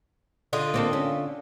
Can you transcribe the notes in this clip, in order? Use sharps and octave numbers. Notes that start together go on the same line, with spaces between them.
D3 F4 D#5
A#3 C4 A4
C#4